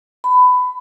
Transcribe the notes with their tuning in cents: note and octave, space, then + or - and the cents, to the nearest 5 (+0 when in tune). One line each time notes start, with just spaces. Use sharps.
B5 +20